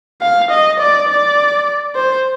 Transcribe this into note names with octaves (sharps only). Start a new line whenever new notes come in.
F5
D#5
D5
D5
C5